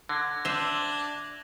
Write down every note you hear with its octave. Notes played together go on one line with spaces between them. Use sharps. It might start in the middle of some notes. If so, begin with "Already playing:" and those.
D3 F#6 G#6 A#6
D4 C5 E5 D#7 F7 F#7